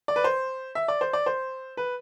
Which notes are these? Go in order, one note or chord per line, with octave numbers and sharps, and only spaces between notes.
D5
B4
C5
E5
D5
C5
D5
C5
B4